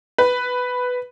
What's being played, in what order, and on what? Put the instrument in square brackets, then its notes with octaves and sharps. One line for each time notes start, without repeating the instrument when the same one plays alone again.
[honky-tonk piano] B4